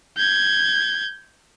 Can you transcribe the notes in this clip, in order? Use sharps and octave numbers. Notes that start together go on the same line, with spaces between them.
G6 G#6